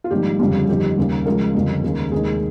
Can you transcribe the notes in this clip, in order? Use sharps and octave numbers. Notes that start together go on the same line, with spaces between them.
F4
A#1 G#2 D#3 G3 G4
G1 F2 C#3 G3
G1 F2 D#3 G4
D#2 C#3 G3
C#2 C#3 F3 G#3 A#4
G1 F2 C#3 G3
D#2 C#3 G#3
F1 D#2 D#3 G#3 G#4